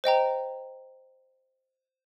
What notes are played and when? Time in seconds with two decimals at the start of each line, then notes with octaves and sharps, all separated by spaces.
0.04 C5 D#5 G5 A#5